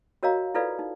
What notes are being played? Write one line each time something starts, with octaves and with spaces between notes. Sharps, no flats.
F#4 A#4 C#5 D#5 F5 A#5
E4 F4 A4 B4 D5 F5
D#4